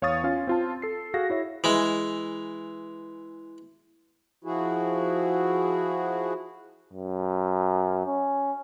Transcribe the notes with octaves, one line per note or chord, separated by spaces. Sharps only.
E2 C#5 F5 C#6 D#6 A6
C#4 F4 F5
C4 F4 A5
A4 C7
F#4 G#4 F5 A#6
E4 C#5 E5
E3 G#3
F3 E4 F#4 G#4
F#2
C#4